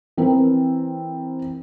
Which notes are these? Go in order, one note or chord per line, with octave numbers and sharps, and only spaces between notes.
E3 C4 A#4